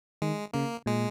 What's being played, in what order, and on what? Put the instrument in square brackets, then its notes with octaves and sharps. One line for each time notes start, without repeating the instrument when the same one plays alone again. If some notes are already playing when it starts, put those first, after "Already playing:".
[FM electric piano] D#3 [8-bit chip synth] G#3
[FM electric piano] C#3 [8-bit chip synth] A#3
[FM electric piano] A#2 [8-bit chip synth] G#3